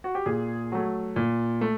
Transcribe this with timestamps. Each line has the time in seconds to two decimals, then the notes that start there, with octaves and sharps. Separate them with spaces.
0.04 F#4
0.15 G4
0.26 A#2 G#4
0.72 F#3 A3
1.16 A#2
1.61 A3